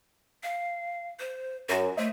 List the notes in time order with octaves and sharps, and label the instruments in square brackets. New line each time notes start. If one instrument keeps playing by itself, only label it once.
[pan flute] F5
C5
[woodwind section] F#2 [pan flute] F#4
[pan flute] A3 [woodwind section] C5 D#5 E5